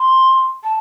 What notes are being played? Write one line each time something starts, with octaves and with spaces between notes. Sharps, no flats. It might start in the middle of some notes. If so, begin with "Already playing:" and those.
Already playing: C6
A5